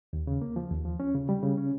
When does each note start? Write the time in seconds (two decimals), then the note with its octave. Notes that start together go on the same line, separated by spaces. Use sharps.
0.13 D#2
0.27 C#3
0.42 A#3
0.56 F3
0.71 D#2
0.85 F3
1.00 C#4
1.15 C#3
1.29 G3
1.43 C#3
1.58 C#4